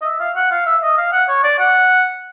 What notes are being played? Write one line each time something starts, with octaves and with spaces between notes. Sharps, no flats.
D#5
E5
F5
F#5
F5
E5
D#5
F5
F#5
C#5
D5
F#5